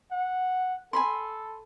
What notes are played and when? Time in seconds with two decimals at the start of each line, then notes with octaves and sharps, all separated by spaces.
0.12 F#5
0.93 A4 G#5 B5 C6